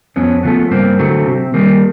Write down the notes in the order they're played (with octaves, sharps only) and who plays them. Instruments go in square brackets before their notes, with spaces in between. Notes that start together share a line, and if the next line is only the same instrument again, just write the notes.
[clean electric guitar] F2 B3 C#4
C#3 F3 A3 B3
G2 A#3 C4
D3 F#3 A3
C3
D#3 G3 A#3